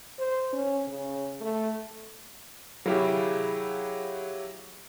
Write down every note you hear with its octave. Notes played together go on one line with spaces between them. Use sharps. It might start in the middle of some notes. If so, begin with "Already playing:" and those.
C5
C#4
C#3
A3
F#3 E4 G4 G#4 F5